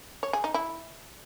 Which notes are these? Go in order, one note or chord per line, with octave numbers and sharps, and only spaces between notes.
C#5
G#4
D#4
E4